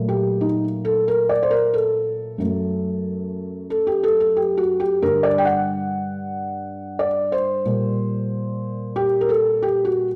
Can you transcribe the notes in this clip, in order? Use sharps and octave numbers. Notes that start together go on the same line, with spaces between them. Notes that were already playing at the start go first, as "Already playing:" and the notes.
Already playing: A#2 F#3 A3
G4
D#4
A4
A#4
D5
C5
A#4
A4
F#2 F#3 A3
A4
G4
A4
A4
G4
F#4
G4
G2 D3 G3 A#4
D5
G5
F#5
D5
C5
A#2 G3
G4
A#4
A4
G4
F#4